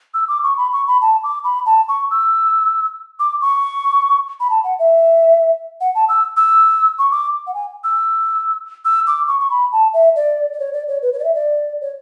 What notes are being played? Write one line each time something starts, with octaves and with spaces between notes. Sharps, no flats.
E6
D6
C#6
B5
C#6
B5
A5
D6
B5
A5
C#6
E6
D6
C#6
B5
A5
F#5
E5
F#5
A5
E6
E6
C#6
D6
F#5
G#5
E6
E6
D6
C#6
C#6
B5
A5
E5
D5
D5
C#5
D5
C#5
B4
C#5
D5
E5
D5
C#5